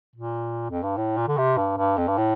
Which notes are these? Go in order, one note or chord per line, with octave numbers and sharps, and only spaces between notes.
A#2
F2
G2
A2
A#2
D3
C3
G2
G2
F2
G2
A2